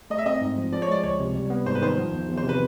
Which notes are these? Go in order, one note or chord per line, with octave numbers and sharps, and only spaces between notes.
A3 D#5
E5
C4 D#5
G#2
F3
F3 D5
C#5
G#3 D5
C#2 C#5
C3
G3
B3
G#2 C5
B4
D#3 C5
F3
E2
E2
C5
C3
B4